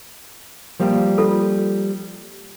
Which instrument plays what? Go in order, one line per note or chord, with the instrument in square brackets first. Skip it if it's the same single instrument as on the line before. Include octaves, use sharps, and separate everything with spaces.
[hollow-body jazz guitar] F3 G3 A#3
[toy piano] F4 A4